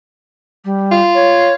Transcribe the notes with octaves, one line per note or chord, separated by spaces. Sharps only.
G3
F4
C#5